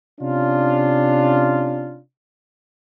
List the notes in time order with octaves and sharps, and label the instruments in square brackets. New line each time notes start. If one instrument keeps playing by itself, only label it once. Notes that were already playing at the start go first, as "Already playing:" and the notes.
[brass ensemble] C3 C#4 D4 F4